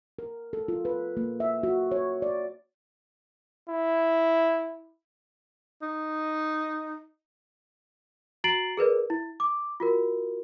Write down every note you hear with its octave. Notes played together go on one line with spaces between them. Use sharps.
A#4
A4
F4
B4
A#3
E5
F#4
C#5
D5
E4
D#4
F#4 A#5 A6 C7 D7 F#7
G#4 A#4 B4 D5
E4
D6
F4 F#4 A#4